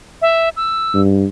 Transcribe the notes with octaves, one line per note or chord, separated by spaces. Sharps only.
E5
E6
G2